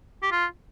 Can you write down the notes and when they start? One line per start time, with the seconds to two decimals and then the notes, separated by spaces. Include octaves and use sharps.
0.23 G4
0.32 F4